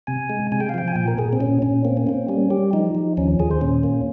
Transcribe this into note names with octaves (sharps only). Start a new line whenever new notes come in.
C3 G#5
G#3
C3 G#5
G5
F5
F3 G5
G#5
A#2 G5
A#4
A#2 G#4
C4
A#2 C#4
A#2 C#4
A#3 C4
C#4
A#3 C4
G3 C#4
G3 G4
F3 D#4
F3
D#2 C#4
D#2 G#4
C5
A#2 C#4
A#3